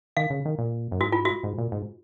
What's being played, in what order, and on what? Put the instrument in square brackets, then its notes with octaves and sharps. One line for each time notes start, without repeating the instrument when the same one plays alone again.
[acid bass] D#3 [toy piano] F5
[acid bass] C#3
D#3
A#2
F#2
[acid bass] G#2 [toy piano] F#4
[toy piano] F4
F#4
[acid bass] G#2
A#2
G#2